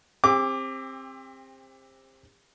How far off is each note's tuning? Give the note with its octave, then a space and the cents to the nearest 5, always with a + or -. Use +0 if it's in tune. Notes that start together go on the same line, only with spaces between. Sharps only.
C4 +20 G4 +40 D6 +0